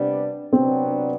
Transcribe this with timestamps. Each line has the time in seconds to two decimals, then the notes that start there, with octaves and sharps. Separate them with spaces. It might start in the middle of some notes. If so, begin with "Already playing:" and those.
Already playing: C3 G3 B3 D4
0.53 C3 F#3 B3 C4 D4